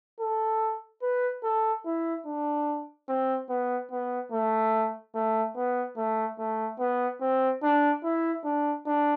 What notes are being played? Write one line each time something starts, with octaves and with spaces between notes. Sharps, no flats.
A4
B4
A4
E4
D4
C4
B3
B3
A3
A3
B3
A3
A3
B3
C4
D4
E4
D4
D4